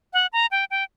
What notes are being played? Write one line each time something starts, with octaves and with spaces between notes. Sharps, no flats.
F#5
A#5
G5
G5